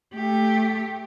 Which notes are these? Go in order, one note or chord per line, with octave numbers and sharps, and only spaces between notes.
A3 G4